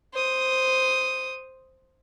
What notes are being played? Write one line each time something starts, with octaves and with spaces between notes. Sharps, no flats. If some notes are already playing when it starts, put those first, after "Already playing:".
C5 D#6